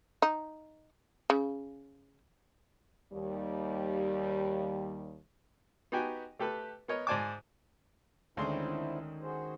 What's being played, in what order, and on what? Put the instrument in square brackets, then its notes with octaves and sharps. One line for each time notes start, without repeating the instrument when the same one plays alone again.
[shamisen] D#4
C#3
[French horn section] D#2 G3
[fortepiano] B3 D#4 F#4 G4 G5 G#5
A3 G4 A4 B4
B3 A#4 C#5 D#5
G#2 C5 D5 G#5 A5 D6
[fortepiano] D2 C6 [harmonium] D3 C4 E4 [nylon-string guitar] D#3 G#3 C#4
[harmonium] F#4 G#4 C5